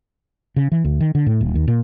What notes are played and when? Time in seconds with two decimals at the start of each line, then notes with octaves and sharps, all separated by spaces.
0.56 C#3
0.72 E3
0.84 D2
1.01 D#3
1.15 D3
1.26 A2
1.41 D#1
1.55 D#2
1.68 A#2